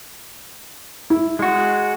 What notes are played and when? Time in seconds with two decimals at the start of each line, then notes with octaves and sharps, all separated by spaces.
1.10 E4
1.39 G#3 F#4